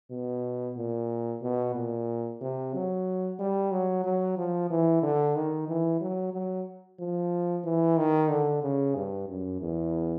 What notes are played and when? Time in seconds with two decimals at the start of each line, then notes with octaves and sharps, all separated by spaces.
0.11 B2
0.77 A#2
1.42 B2
1.75 A#2
2.41 C3
2.74 F#3
3.39 G3
3.71 F#3
4.04 F#3
4.37 F3
4.70 E3
5.03 D3
5.35 D#3
5.68 E3
6.01 F#3
6.33 F#3
6.99 F3
7.64 E3
7.97 D#3
8.29 D3
8.63 C#3
8.95 G2
9.28 F#2
9.61 E2